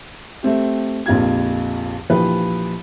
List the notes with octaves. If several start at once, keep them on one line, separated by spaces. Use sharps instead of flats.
A3 C4 G4
A#1 F2 F4 G4 G#6
A#1 E3 F3 G4 B4